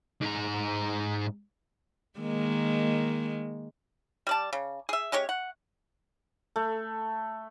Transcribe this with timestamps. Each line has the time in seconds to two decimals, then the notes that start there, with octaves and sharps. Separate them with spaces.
0.22 G#2 A#5
2.19 D#3 G#3 A#3
4.27 G3 D5 A5
4.53 C#3
4.89 G#4 E5
5.12 G#3 C#4 G4 C#5
5.29 F#5
6.56 A3